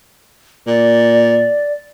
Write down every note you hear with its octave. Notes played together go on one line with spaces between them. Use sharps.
A#2 D5